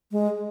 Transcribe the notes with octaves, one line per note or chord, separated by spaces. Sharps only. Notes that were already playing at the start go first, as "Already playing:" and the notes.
G#3